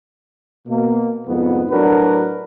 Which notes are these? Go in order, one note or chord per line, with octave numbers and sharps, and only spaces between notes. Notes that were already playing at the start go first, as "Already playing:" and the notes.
B2 A#3
C2 F2 G#2 B3
A2 F#3 D4 F#4 A#4 B4